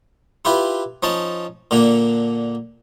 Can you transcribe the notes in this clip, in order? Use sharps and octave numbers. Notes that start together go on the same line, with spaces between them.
E4 F4 G4 B4
F3 C#4 D#4 A5
A#2 D3 A#3 D4